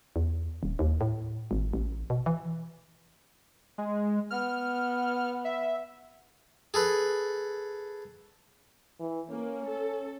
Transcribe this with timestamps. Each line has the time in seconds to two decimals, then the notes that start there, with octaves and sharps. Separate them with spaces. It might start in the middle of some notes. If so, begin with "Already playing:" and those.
0.16 E2
0.63 D#1
0.79 D#2
1.01 A2
1.51 G#1
1.73 A1
2.10 B2
2.26 E3
3.78 G#3
4.31 B3 F6
5.45 E5
6.74 G#4 A4 B4
9.00 E3
9.30 A#3 C#4
9.67 A4